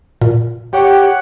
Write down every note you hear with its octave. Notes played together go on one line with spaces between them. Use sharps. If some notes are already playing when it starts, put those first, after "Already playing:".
A#2
G4 C#5 F#5